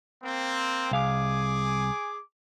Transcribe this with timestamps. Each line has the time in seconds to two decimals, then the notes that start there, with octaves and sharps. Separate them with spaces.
0.23 A#3 C4
0.91 C2 G#4 F5 G#5 D6